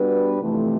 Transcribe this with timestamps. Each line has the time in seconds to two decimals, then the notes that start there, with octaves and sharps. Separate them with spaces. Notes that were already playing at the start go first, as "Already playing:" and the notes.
Already playing: G3 B3 D4 F#4 B4
0.40 F2 C3 E3 A3